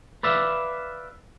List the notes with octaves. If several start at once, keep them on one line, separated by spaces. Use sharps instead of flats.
B4 D5 E5 F5